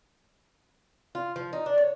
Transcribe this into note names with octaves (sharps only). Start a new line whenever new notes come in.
F4
F3
D#4
D4
C#5